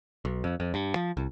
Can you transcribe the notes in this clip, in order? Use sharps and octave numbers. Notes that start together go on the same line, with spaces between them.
B1
F2
F2
G2
F3
C2